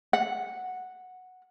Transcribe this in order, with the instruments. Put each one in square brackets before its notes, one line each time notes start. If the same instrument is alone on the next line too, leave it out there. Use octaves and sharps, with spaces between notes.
[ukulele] F#5